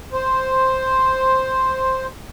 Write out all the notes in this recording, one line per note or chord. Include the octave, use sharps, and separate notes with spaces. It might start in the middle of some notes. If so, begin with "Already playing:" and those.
C5